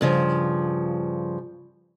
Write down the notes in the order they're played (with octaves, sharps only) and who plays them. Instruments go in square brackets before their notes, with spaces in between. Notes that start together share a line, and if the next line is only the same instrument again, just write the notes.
[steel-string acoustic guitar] G2 C#3 F3